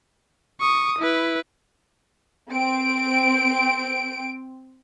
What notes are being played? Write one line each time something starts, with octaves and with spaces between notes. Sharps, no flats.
C#6 D#6
E4 B4
C4 D7